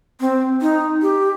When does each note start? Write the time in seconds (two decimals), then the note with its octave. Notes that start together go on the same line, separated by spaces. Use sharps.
0.21 C4
0.61 D#4
1.02 G4